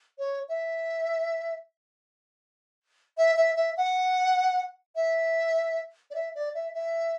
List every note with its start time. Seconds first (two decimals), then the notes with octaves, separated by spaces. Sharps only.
0.18 C#5
0.49 E5
3.17 E5
3.37 E5
3.56 E5
3.77 F#5
4.95 E5
6.10 D5
6.15 E5
6.35 D5
6.54 E5
6.74 E5